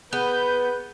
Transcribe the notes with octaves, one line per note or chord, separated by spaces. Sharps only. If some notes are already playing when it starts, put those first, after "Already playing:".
B3 G#4 B4 F#6 G6